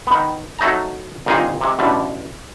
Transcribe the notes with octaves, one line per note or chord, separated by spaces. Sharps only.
D#3 B3
F#3 A3 D#4 A5 A#5
G1 A#2 D#3 C4 D#4 G#4
C3 G#3
A1 B2 D3 G3